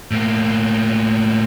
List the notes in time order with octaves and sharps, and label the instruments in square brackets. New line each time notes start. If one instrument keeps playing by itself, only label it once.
[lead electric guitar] A2 A#3